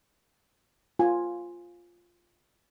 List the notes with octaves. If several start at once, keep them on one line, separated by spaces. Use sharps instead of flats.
F4 G#5